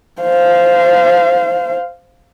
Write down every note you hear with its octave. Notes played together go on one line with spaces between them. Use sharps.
C5 F5